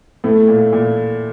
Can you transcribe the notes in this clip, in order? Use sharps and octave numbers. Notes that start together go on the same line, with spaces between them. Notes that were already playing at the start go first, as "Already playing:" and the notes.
A2 A3
A#2
A#2